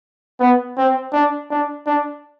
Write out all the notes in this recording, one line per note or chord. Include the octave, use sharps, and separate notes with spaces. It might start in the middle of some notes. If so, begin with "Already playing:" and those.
B3
C4
D4
D4
D4